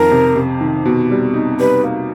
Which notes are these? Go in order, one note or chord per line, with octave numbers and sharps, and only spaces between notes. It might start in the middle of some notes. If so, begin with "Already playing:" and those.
Already playing: F2 D#3 A#4
C3
C3
D#3
B2
G3
D#4
G3 B4
A#3